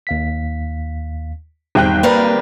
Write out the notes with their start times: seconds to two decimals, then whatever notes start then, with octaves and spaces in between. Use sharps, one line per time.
0.07 D#2 F5 B6
1.75 G#1 E2 G3 D#4 G5 F#6
2.03 G3 A#3 A#4 B4